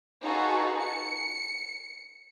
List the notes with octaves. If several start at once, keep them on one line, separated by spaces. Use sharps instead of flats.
D#4 F4 F#4 G#4 A4 B4
C#7